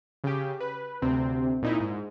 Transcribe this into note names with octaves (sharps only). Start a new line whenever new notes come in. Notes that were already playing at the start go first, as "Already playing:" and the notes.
C#3 G4
B4
D2 C3 C4
A#2 D#4 E4
G#2